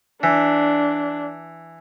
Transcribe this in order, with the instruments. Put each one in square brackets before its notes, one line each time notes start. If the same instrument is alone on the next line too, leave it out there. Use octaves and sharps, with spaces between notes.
[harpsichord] E3 [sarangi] D4